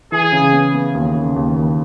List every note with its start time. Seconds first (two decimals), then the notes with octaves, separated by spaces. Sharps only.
0.12 E3 G#4
0.32 C#3
0.53 B3
0.74 B3
0.95 D#2
1.15 C#3
1.36 D#2
1.56 D#2